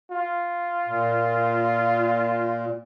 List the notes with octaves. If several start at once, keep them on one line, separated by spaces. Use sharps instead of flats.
F4
A#2